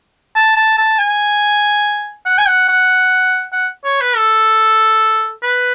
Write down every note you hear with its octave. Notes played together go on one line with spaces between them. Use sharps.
A5
A5
A5
G#5
F#5
G#5
F#5
F#5
F#5
C#5
B4
A4
B4